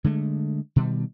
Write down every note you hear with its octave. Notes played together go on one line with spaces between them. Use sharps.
D3 G#3 A3
B2 D#3 G3